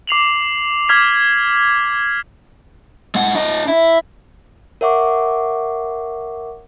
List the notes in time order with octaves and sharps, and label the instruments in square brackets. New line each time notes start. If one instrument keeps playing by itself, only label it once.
[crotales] D6 C7 F7 F#7
D6 F6 G#6 B6 F7
[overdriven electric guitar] G#3 F#5
D4 D#5
E4
[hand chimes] A#4 C#5 E5 F#5 C#6 D6